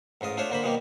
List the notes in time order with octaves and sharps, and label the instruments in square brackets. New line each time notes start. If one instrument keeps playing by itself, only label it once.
[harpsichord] A1 G#2 F4 D#5
A3 D4 F4 C5 C#5
D3 A#3 C5 B5
B2 D#3 F3 G3 A#3